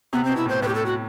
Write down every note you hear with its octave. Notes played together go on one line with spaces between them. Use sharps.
C3 B3
B2 C4
E4
A2 C5
A2 B4
G4
A4
F#4